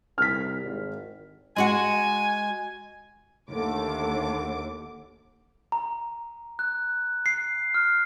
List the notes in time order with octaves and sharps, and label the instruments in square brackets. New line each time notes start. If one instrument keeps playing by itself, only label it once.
[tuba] C2 [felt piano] F6 B6
[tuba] G#1
[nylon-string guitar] G#3 F#4 F#5 [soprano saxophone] G#5
[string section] D#2 D6 [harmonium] D3 [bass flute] A3
[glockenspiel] A#5
F#6
C7
F6